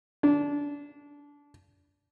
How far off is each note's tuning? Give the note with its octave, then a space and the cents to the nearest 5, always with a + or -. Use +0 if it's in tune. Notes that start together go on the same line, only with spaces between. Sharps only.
D4 -25